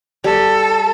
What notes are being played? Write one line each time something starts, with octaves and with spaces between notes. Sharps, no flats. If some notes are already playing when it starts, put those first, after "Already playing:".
G3 A4